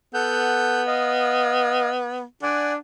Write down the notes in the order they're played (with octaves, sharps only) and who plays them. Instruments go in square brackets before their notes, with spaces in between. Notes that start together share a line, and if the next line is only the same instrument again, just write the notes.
[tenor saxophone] B3 [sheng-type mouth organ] A4 F#5 G6
[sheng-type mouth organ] D#5 F5
[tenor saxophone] D4 [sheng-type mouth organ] D5 F#5 G#5